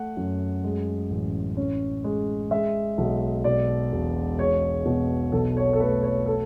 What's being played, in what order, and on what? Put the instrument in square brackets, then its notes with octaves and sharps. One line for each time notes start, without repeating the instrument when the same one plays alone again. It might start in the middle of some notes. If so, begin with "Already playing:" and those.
Already playing: [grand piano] A3 F#5
F#2
G#3
A1
C#4
G#3
G#3 E5
B1
B2 D5
E1
G#3 C#5
B2
B1 A4
C#5
A4
A3 B4
C#5
A4